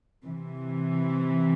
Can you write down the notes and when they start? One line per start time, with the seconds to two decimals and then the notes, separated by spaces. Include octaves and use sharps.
0.25 C3 E3